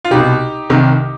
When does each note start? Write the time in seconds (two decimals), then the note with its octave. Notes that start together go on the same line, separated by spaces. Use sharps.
0.04 F4
0.11 C2 B2 D#4 G4
0.69 C2 C3 D#3